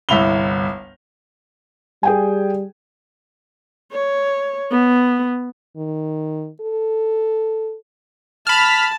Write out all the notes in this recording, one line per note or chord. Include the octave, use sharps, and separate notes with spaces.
G1 C2 E4 B5 F7 G7
G3 G#4 G5 G#5
C#5
B3
D#3
A4
A5 B5 F6